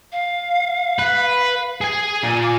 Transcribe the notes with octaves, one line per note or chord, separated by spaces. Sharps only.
F5
B4
G#4 G#5
A#2 G#5
D6